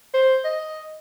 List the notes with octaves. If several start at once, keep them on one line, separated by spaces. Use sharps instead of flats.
C5
D#5